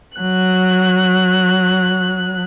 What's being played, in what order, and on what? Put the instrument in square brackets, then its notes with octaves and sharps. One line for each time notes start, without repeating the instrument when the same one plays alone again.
[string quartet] F#3 F#6